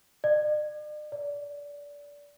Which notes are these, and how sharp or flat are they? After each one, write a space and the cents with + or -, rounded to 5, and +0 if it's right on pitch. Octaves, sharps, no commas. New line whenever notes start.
D5 +45
D5 -25